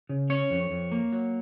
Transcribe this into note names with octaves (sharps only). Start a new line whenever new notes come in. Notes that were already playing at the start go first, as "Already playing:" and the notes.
C#3
C#4 C#5
F2
F2
A#3
F#3